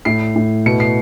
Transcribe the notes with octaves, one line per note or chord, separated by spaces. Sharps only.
A2 C7
A2
B2 C#7
C7